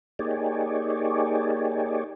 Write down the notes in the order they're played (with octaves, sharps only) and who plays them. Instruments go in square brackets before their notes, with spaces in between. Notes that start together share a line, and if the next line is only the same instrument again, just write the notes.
[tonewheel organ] A#3 D#4 G4 G#4 C#5 D5